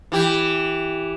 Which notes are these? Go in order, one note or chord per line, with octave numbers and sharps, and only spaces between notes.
E3 G4